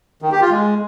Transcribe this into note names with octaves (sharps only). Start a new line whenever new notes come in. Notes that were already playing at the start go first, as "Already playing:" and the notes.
D#3
G4
F4
G#3